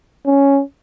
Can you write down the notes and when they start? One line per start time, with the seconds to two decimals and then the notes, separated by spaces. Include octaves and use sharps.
0.26 C#4